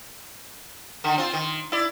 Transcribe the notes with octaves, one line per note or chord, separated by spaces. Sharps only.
D3 D#3
C4 F4
D#3
E4 D5